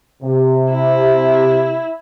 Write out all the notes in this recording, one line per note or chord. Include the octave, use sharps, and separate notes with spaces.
C3
E4